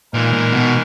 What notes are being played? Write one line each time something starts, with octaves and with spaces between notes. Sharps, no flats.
A#2 E3 G#3 D#4 A#4
A#2
B2